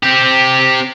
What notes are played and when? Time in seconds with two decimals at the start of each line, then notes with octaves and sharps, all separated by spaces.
0.03 C4 G4